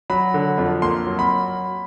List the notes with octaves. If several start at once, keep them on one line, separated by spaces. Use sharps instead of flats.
F#3 B5
D3
F2
A#3 C6
F#3
B5